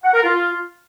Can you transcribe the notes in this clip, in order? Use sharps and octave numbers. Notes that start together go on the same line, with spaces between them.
F#5
A#4
F4